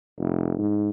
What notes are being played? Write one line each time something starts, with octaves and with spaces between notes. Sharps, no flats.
F1
G#2